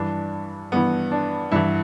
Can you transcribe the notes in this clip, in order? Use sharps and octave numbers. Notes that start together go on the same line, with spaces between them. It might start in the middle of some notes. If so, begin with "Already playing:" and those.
Already playing: G2 E3 D4
G2 E3 B3
D4
G2 E3 E4